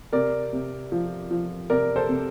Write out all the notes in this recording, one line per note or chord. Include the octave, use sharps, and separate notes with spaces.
C3 A#4 D5
C3
F3
F3
C3 A#4 D5
A4 C5
C3